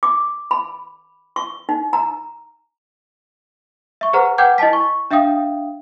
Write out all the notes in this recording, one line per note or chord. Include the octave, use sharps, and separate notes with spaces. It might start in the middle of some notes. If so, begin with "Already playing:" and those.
D6
B5
C#6
D#4
A#5
E5 C#6
G#4 B4 C5 F#5 A#5
B4 F#5 G5 D6 G6 G#6
E4 D#5 G#5 A5 B6
C#6
D4 E5 F5 G5 D#6